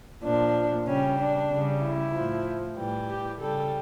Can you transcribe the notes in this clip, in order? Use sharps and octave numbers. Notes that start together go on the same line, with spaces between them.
A#2 F3 D4
C#3 G3 C#4
D4
C#3 G3
E4
A2 F3
A2 E3 G3
G4
C#3 G3 A4